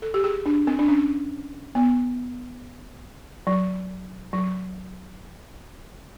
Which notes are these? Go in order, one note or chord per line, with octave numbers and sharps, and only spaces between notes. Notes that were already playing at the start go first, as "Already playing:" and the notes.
A4
G4
G#4
D4
C4
D4
C#4
B3
F#3
F#3